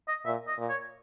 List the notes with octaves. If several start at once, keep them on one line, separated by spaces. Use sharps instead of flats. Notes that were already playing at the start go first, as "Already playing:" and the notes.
D#5
A#2 E5
D#5
A#2
C#5